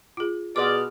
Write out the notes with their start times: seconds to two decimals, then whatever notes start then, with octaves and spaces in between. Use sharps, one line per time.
0.17 F4 G#4
0.56 B2 G#4 D5 F#5 C6 D6 F6